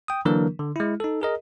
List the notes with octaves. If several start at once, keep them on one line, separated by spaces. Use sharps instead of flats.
G5 D#6
D3 E3 F#3 A#3 D4 A#4
D3
G#3 E4
D#4 A4
G#4 A#4 D#5